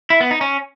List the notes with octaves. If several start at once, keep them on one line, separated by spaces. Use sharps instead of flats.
E4
B3
D#4
C#4